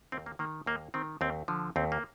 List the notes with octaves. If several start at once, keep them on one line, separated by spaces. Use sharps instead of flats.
D#2 C4
A#3
D#3 A#3
D#2 A#3
D#3 C4
D#2 C4
D3 F3
D#2 C4
A#3